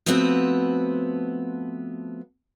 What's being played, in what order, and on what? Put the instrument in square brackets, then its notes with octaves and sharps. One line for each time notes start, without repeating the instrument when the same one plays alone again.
[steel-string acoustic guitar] F3 A3 B3 C4 F#4 B4